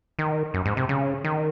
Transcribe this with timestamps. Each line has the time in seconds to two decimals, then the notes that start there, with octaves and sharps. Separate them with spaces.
0.19 D#3
0.54 F#2
0.66 G#2
0.77 C3
0.89 C#3
1.24 D#3